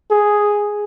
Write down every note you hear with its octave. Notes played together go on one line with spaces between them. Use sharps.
G#4